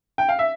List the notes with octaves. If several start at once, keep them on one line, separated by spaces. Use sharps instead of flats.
G5
F5
E5